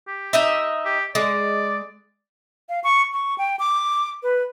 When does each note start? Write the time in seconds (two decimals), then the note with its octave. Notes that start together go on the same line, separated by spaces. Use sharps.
0.08 G4
0.33 D#4 D#5 E5
0.85 G4
1.15 G#3 D5
2.69 F5
2.84 C#6
3.13 C#6
3.38 G5
3.59 D6
4.23 B4